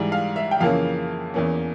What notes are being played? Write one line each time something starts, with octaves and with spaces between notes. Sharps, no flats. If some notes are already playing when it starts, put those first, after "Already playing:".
Already playing: G#2 E3 G3
F5
E5
G5
F2 C#3 E3 A#3 C#4 F5
E2 E3 A#3 C#4